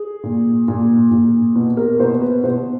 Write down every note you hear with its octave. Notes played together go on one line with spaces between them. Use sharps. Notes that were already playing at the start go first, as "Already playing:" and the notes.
Already playing: G#4
A#2
A#2
A#2
B2
A#4
B2 C5
B4
B2 C5